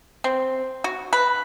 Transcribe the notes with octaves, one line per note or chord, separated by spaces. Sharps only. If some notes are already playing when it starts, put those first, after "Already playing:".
C4
F#4
B4